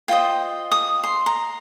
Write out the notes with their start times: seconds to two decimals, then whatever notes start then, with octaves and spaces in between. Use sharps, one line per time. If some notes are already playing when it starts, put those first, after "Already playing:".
0.08 F4 C5 D#5 G5
0.72 D#6
1.03 C6
1.26 A#5